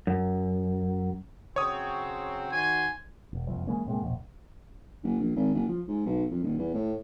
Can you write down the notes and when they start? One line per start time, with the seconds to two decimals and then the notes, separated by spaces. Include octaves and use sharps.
0.07 F#2
1.56 C#3 F#3 C4 C#5 D#6
2.52 D#3 F#4 C5 G#5
3.33 E1
3.47 F#1 C2 F2
3.67 E3 G#3 A#3 C#4
3.87 A2 C3 G#3 A#3
4.01 E1 A#1
5.04 F#1
5.20 A#1
5.36 G#1
5.55 F#1
5.69 F3
5.88 G#2
6.06 B1
6.31 F2
6.44 D#1
6.59 E2
6.74 A2